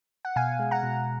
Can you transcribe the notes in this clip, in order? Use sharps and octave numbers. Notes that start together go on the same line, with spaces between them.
F#5
B2 F5 G#5
G#3
F#5 A#5
B2